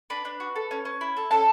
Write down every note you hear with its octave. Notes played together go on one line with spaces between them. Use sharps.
D4 B4 B5
D4
F#4
A4
C#4
C#4
E4
A4
C#4 A4 A5